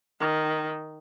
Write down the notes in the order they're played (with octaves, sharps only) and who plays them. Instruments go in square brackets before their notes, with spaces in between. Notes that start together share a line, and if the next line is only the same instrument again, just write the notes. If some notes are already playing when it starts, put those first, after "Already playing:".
[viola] D#3